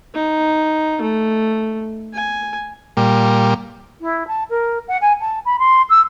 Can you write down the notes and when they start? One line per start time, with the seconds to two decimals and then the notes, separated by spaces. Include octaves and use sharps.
0.14 D#4
1.01 A3
2.13 G#5
2.97 A#2 G3
4.01 E4
4.27 A5
4.50 A#4
4.88 F#5
5.01 G#5
5.20 A5
5.45 B5
5.59 C6
5.89 E6